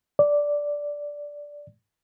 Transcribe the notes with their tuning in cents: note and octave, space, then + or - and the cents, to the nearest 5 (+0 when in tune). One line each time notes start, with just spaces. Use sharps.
D5 -5